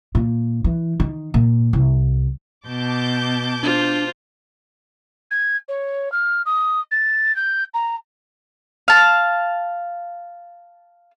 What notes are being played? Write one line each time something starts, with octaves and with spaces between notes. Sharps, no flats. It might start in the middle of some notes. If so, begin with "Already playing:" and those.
A#2
E3
D#3
A#2
C2
B2 A5 D6 G6
D4 F4 C5
G#6
C#5
F6
D#6
A6
G6
A#5
F5 A5